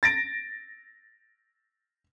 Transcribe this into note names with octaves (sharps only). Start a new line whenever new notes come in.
A6 A#6 D7